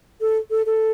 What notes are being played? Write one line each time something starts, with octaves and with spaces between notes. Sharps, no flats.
A4
A4
A4